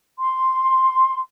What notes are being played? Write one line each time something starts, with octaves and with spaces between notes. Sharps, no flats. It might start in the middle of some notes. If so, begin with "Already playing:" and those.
C6